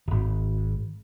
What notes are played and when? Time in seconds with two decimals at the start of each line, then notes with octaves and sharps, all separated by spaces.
0.08 D1 G#1